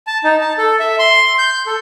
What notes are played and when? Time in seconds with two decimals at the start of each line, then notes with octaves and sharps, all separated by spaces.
0.07 A5
0.24 D#4
0.41 A5
0.58 A4
0.80 E5
0.99 C6
1.39 G6
1.66 A4